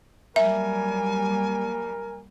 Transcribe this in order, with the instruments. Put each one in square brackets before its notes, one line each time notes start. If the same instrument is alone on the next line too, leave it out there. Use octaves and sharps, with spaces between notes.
[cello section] F#3 G3 A#3 [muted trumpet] A#4 [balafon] E5 [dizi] G#5